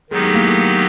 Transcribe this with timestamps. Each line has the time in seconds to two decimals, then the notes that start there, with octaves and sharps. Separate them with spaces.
0.10 D#3 F#3 G#3 B3 D#4 G4
0.23 A3
0.35 A#3
0.47 A3